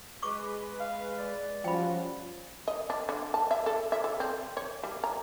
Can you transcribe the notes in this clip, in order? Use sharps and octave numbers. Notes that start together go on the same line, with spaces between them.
G#3 B4 C#6 D6
F5
D5
F3 G3 C#4 F#4 G5 B5
D#5
D4
D3
A5
E5
A4
E5
A4
C4
C#5
G3
A#5